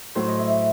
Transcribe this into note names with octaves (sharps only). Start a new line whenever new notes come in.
A2 F#3 A3 C5
D#5
E5
E5